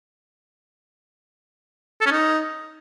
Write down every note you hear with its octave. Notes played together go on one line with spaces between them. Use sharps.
A4
C#4
D#4